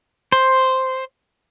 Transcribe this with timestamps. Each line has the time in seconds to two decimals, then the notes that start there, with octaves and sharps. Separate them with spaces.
0.32 C5